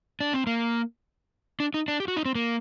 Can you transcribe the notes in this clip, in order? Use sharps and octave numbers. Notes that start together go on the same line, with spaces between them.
D4
C4
A#3
D4
D#4
D4
G4
F#4
D#4
C4
A#3